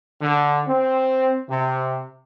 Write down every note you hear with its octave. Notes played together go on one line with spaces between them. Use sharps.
D3
C4
C3